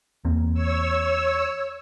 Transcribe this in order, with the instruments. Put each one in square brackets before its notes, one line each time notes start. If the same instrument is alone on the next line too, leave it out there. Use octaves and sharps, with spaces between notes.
[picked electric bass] E2 A#3 C4
[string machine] C#5 E6